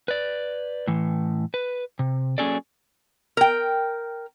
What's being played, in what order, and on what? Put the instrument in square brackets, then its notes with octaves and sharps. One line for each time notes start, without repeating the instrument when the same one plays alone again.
[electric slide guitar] B4 D5
A2 E3
B4
C3
F#3 A#3 C#4 G#4 A4 D5
[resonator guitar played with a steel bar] A#4 G5